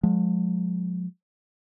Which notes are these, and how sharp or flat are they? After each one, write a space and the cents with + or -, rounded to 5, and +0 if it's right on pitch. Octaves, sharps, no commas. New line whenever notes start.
F3 +45 G#3 +10